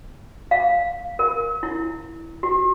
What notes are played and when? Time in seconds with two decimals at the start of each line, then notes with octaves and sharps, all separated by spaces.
0.51 F5
1.19 A#4
1.63 E4
2.43 F#4